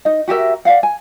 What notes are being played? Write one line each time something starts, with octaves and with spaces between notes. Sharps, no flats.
D#4 D#5
F#4 G4 A#4 E5
D5 D#5 F5 F#5
G#5